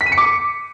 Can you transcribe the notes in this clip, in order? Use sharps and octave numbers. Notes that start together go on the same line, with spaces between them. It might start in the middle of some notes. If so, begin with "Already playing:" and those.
B6
D#7
C#7
D6